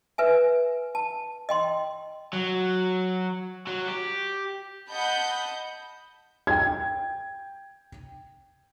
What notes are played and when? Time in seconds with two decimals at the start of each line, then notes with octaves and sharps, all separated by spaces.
0.18 B4 E5 G#5
0.95 A5
1.49 D#5 G5 C6
2.33 F#3
3.67 F#3
3.88 G4
4.91 D#5 F#5 A5 B5 G6
6.47 G5 G#6